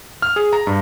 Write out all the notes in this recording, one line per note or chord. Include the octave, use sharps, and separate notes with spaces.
F6
G#4
A#5
G2